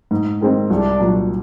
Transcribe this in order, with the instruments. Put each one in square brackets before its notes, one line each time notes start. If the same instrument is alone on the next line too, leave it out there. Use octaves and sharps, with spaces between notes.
[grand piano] G#2
D#3 G#3 C4
[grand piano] C2 [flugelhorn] D4
[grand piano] A#2 F#3